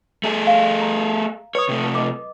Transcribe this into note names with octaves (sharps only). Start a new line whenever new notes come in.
A3 G#4
F5
A#5
B4 C#5 D#6
C3 A3
D#5 D6